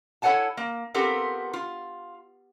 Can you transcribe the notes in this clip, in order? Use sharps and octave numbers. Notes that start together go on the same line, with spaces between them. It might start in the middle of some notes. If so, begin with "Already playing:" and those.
E4 A4 C#5 F#5 G#5 A5
A#3
B3 C4 F4 G4 A4 A#4
F4